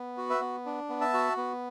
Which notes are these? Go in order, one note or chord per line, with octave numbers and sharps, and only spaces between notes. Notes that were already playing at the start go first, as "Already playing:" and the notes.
Already playing: B3
F#4
B4 E5
B3
D4
B3
E5 A5
F#4
B3